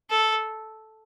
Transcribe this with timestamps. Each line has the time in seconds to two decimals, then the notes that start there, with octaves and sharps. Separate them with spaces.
0.10 A4